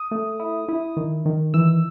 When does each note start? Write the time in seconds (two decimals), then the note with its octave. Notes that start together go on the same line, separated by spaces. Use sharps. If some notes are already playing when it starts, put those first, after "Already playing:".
Already playing: D#6
0.11 A3
0.40 E4
0.68 E4
0.97 D#3
1.26 D#3
1.54 E3 E6